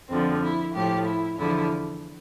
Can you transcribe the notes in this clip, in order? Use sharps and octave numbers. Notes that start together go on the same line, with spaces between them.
F2 D3 F3 C4
E4
A2 F3 G4
E4
E2 D3 F3 E4